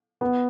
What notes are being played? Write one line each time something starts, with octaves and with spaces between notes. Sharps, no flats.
B3